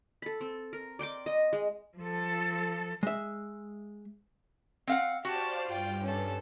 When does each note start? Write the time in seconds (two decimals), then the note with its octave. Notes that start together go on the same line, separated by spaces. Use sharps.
0.22 A4 B5
0.41 C4
0.73 A#4
0.99 D5 G5 C6 D6
1.26 D#5
1.53 G#3
1.98 F3 A4
3.03 G#3 E5
4.87 C4 F5 F#5
5.25 F#4 G4 C5 D5 F5 A5
5.67 G2 F4 G5
6.03 C#4 A4